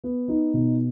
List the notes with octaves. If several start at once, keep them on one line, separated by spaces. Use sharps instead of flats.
B3
D#4
B2